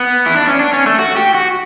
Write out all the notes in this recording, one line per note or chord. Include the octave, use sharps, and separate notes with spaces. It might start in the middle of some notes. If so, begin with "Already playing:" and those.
Already playing: B3
E4
D4
C#4
D4
C#4
A3
F#4
G4
F#4